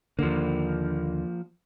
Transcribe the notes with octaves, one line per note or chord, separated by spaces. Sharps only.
D#2 D3 F3 A#3